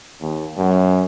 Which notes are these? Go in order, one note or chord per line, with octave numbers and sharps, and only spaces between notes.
D#2
F#2